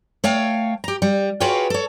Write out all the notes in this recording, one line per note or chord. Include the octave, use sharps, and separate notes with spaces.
A3 C#5 F5 G5
G4 A#5
G3
F4 F#4 G#4 B4 C#5 G5
A4 C#5